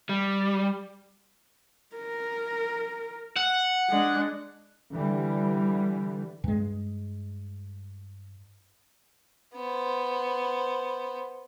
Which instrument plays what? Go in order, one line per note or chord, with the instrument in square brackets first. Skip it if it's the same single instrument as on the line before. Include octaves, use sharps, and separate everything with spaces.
[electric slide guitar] G3
[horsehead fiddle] A#4
[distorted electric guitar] F#5
[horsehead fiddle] G#3 D4
[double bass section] D3 E3 G3
[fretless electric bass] G2 G#3
[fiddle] B3 C5